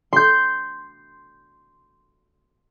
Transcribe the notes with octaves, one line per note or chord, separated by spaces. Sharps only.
C6 G6